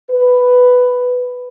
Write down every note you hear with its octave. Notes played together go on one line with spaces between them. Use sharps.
B4